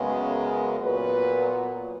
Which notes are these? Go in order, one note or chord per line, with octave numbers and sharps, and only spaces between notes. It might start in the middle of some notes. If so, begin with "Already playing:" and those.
Already playing: F#2 C#3 G#3 B3
A#4
A#2 F#3 B3 B4